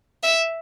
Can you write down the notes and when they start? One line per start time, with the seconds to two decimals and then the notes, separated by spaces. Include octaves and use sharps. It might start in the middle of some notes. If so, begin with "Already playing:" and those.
0.23 E5